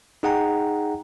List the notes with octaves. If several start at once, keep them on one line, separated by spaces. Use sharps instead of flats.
D#4 G#4 F#5 G5 A#5